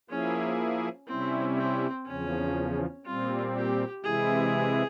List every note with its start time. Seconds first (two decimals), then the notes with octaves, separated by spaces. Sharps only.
0.10 F3 A#3 C#4 E4 G#4
1.08 C3 G3 C4 C#4 E4
1.58 C4
2.06 E2 C#3 F3 C#4
3.05 A#2 G3 C4 F4
3.55 G4
4.04 C3 E3 G#3 E4 G#4